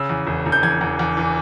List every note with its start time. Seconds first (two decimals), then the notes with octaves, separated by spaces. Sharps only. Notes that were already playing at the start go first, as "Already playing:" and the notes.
Already playing: C#3 E6
0.09 E2
0.27 E1
0.46 E1
0.52 G6
0.63 E2 G#6
0.81 E2
0.99 E2
1.17 E3